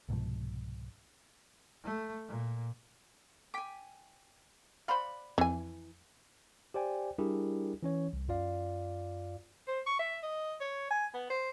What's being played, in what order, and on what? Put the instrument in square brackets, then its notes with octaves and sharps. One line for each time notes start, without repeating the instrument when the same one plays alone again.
[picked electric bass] C2 G#2 B2 F3
[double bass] A3
A#2
[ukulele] G5 G#5 [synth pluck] D6 B6
[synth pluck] C5 F5 [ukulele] D5 F#5 B5
[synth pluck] F2 [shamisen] E3 G#5
[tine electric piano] G4 C5 D5 G5 G#5
G3 D4 E4 G4 G#4 A#4
E3 C#4 C#5
C2
F#2 F4 D5 F5
[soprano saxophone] C5
C#6
E5
D#5
C#5
G#5
B3
C5